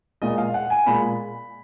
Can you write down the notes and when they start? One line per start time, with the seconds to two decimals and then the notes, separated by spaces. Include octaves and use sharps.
0.22 A#2 G#3 D#5
0.38 F5
0.54 F#5
0.70 G#5
0.86 A#2 G#3 B5